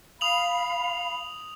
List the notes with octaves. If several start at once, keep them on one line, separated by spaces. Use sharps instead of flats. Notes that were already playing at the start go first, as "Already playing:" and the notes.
F5 B5 D#6 F7 F#7